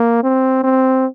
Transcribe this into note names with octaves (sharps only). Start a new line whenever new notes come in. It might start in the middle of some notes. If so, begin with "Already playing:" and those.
Already playing: A#3
C4
C4